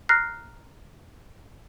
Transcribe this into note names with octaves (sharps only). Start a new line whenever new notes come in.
A#5 F6 F#6 A#6 C7